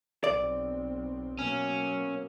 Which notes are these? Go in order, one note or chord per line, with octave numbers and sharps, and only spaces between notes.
B1 C4 D5
B2 F#3 A#3 C#4